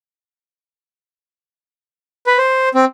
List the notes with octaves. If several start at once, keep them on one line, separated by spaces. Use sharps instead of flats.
B4
C5
C4